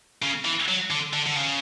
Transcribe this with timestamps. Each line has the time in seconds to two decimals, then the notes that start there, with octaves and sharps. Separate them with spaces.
0.23 C#3
0.45 E3
0.69 F#3
0.91 D3
1.13 D3
1.26 D3
1.37 C#3